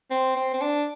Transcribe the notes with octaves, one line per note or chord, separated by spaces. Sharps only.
C4
C4
C4
D4